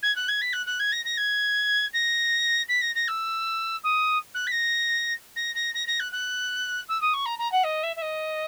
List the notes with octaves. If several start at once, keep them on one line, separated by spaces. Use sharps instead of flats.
G#6
F#6
G#6
B6
F#6
F#6
G#6
A#6
A#6
G#6
A#6
B6
A#6
A#6
E6
D#6
F#6
B6
A#6
A#6
A#6
A#6
A#6
F#6
F#6
E6
D#6
C#6
A#5
A#5
F#5
D#5
E5
E5
D#5